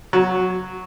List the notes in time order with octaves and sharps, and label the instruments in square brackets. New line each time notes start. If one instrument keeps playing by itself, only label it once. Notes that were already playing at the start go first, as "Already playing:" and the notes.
[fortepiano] F#3